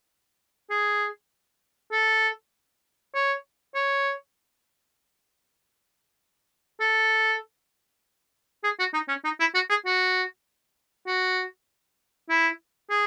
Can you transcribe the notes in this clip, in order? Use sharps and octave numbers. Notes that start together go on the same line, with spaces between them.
G#4
A4
C#5
C#5
A4
G#4
F#4
D#4
C#4
D#4
E4
F#4
G#4
F#4
F#4
E4
G#4